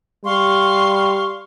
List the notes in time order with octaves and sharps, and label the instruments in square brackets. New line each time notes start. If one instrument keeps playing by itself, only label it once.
[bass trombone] G3 [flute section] F5 C6 C#6